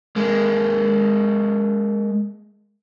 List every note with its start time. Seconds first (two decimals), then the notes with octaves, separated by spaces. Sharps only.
0.16 G#3 A#3